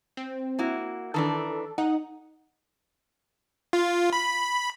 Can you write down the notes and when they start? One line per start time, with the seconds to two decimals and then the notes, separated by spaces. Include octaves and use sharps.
0.17 C4
0.59 A#3 E4 F#4
1.14 D#3 E3 D4 A4
1.78 D#4 F#5
3.73 F4
4.13 B5